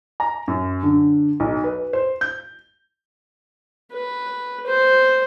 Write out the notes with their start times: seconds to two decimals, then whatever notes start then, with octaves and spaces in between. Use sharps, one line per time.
0.20 A#5
0.48 F#2
0.83 D3
1.40 B1
1.64 B4
1.93 C5
2.21 G6
3.93 B4
4.66 C5